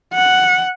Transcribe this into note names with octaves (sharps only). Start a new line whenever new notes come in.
F#5